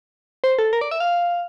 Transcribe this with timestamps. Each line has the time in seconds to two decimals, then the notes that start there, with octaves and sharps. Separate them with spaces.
0.44 C5
0.59 A4
0.73 A#4
0.81 D5
0.91 E5
1.00 F5